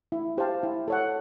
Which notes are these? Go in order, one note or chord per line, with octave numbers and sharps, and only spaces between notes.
E4
G4 C5 F5 A5
E4
A4 C#5 F#5